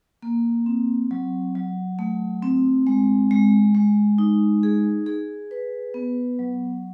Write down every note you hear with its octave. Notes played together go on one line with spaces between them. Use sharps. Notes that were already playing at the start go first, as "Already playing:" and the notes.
A#3
C4
F#3
F#3
A3
C4
G#3
G#3
G#3
D#4
G#4
G#4
B4
B3
F#3